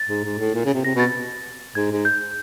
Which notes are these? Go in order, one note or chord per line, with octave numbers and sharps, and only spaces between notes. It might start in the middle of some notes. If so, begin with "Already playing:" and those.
Already playing: A6
G#2
G#2
A2
A#2
C#3
C3
C3 A#6
B2
A6
G#2 G#6
G#2
G6